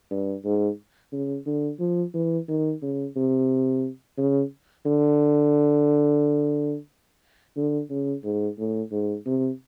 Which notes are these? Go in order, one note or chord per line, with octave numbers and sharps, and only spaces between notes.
G2
G#2
C#3
D3
F3
E3
D#3
C#3
C3
C#3
D3
D3
C#3
G#2
A2
G#2
C3